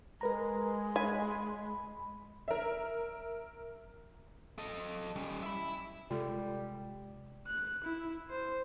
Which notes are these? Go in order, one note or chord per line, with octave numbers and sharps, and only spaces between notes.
G#3 A#4 B4 A#5
G#5 B5
A#4 E5
A4 D#5
G3 C#4
E5 B5
C3 G3 G#3 F4 A4
F#6
E4
C5